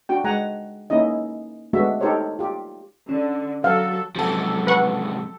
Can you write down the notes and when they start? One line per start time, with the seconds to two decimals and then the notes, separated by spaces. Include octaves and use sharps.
0.09 D4 F#4 G5
0.24 G#3 F#5 G#5 A#5
0.90 A#3 C#4 D#4 E4 D#5
1.73 G#3 A3 B3 D4 F#4 E5
2.01 D#4 G4 A4 A#4 C5 C#5
2.39 F4 G4
3.09 D3 C#4
3.64 F#3 A4 F5
4.15 G#2 C3 F3 F#3 G4 A4
4.67 B4 F#5 C#6